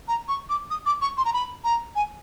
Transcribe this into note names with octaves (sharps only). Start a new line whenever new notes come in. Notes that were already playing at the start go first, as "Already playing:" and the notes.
A#5
C#6
D6
D#6
D6
C#6
C6
A#5
B5
A#5
G#5